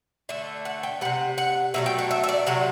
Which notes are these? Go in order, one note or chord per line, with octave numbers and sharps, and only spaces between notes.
D3 A3 E5
F#5
G5
C3 G3 F#5
F#5
B2 F#3 A3 E5
G5
F#5
E5
E5
D5
C3 F#3 A3 F#5